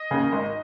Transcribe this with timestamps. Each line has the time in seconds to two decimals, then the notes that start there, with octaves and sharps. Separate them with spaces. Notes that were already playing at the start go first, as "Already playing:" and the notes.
Already playing: D#5
0.11 D#2 C#3
0.32 G#1